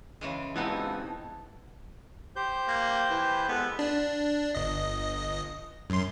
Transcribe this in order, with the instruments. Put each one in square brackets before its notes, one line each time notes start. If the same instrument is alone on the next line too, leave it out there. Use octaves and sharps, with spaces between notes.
[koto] C#3 E3 G#3
[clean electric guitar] C#2 E3 [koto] B3 C4 D#4 [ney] A5
[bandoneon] G4 C5 G6
[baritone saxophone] A#3
E3
[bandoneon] G#3 A4 [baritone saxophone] B3
[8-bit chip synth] D4
G1 D#5
F#2 C6